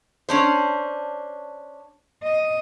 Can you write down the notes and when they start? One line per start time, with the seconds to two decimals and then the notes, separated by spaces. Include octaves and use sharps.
0.29 C#4 D4 C5
2.23 D#5